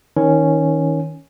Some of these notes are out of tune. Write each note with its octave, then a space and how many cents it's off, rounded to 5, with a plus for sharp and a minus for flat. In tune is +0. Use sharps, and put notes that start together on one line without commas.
D#3 +25 C#4 +0